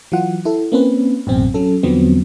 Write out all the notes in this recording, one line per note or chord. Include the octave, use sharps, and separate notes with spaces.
E3 F#3 F4 F#5
E4 A4
A#3 C4 C#4 B4
A1 F#2 B2 C4
F#3 C#4 A4
E2 D3 F3 F#3 B3 C4